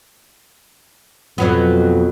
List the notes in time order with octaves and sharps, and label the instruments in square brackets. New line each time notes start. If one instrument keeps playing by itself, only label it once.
[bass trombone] F2 [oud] B2 F#3 B3